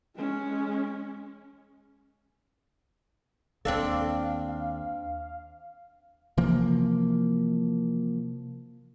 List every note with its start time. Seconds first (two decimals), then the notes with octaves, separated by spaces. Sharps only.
0.16 G#3 C#4
3.65 D#2 C4 D4 A4 F5
4.48 F5
6.37 C3 E3 F3 A#3